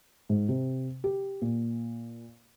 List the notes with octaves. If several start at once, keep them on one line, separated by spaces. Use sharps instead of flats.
G#2
C3
G4
A#2